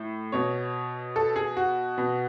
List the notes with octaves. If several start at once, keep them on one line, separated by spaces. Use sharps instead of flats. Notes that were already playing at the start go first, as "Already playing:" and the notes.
Already playing: A2
B2 C#5
A4
G#4
F#4
B2